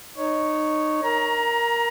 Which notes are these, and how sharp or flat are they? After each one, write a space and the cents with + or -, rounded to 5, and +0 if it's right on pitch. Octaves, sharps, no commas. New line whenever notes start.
D#4 -20 C#5 +0
A#4 +0 A#5 +25